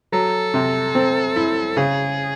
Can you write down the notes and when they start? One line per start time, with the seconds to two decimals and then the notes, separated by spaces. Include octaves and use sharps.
0.12 F#3 A4
0.54 C3
0.95 C4
1.36 E4
1.77 C#3 G#4